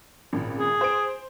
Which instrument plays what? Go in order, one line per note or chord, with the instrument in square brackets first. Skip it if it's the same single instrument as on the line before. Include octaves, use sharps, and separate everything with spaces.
[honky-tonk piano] G#1 A#2 C#3
[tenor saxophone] G#4
[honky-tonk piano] C5 D7